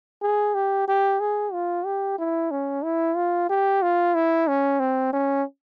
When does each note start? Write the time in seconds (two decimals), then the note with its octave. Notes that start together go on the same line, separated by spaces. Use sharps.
0.22 G#4
0.54 G4
0.88 G4
1.20 G#4
1.53 F4
1.85 G4
2.19 E4
2.51 C#4
2.84 E4
3.16 F4
3.49 G4
3.82 F4
4.15 E4
4.48 C#4
4.80 C4
5.13 C#4